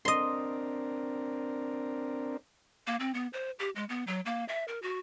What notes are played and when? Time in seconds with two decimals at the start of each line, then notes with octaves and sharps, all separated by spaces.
0.05 C4 D4 A#4 D#5 C6
2.87 A#3
3.00 C4
3.14 B3
3.33 C5
3.59 G4
3.76 G#3
3.89 B3
4.07 F#3
4.26 A#3
4.48 E5
4.68 A#4
4.82 F#4